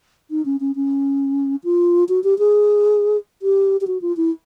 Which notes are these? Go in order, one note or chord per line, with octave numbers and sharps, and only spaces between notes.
D#4
C#4
C#4
C#4
F4
F#4
G4
G#4
G4
G4
F#4
F4
E4